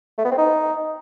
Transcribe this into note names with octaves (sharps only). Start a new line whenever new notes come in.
A3
B3
C4
D#4